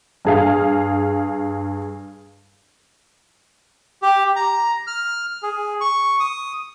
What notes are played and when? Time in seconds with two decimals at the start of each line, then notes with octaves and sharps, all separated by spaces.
0.25 G2 G#4 F5
4.02 G4
4.36 A#5
4.87 F6
5.43 G#4
5.81 C#6
6.20 D#6